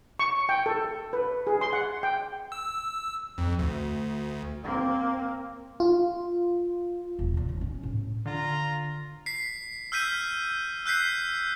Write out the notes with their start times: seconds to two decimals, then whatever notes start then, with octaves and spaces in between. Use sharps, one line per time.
0.19 C#6
0.49 G5
0.66 A4
1.13 B4
1.47 G#4
1.61 C6
1.73 F#5
2.03 G5
2.52 E6
3.38 F2
3.59 D2
4.63 A#3 C4
5.80 F4
7.19 E1
7.34 D#2 A#2
7.49 D#2
7.61 C#4
7.83 A2
8.26 D3 F4 A#5
9.26 B6 C7
9.92 E6 F6 G6 B6 D#7
10.86 E6 F#6 G6 B6 C7